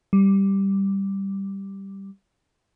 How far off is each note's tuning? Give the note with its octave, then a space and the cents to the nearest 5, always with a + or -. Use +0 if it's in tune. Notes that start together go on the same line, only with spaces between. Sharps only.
G3 +0